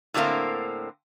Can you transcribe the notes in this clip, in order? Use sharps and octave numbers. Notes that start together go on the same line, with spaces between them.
A2 D3 G3 A3 A#3 C4